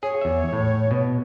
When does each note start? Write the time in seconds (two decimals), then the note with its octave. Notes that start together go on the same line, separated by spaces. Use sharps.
0.03 G#4 C#5
0.21 E2 E5
0.53 A2
0.91 B2